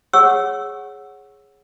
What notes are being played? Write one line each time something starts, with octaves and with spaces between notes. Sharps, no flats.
G#4 C#5 F#5 C#6 E6